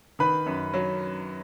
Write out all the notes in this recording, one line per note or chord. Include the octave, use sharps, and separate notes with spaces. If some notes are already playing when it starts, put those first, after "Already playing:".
D#3 B4 B5
F#2
F#3